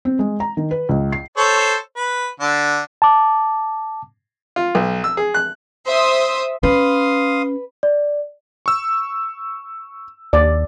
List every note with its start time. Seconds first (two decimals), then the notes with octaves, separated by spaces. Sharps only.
0.05 C4
0.19 G#3
0.40 A#5
0.57 D#3
0.71 B4
0.89 C#2
1.12 C7
1.37 A4 C5 C#5
1.97 B4
2.40 D3 D4
3.02 A5 D6
4.56 F4
4.75 B1
5.04 E6
5.17 G#4
5.34 F#6
5.88 C5 E5 D#6
6.63 C#4 B4 F5 C6 D#6
7.83 D5
8.66 C#6 E6
10.33 D#2 D5